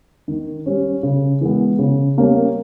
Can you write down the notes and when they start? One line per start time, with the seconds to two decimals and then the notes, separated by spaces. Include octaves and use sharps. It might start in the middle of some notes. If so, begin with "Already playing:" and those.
0.28 D#3
0.66 G3 C#4
1.03 C#3
1.41 E3 G#3 B3
1.79 C#3
2.17 G3 A#3 C#4